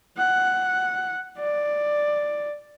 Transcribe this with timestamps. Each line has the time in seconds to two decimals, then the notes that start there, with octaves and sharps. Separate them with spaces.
0.18 F#5
1.40 D5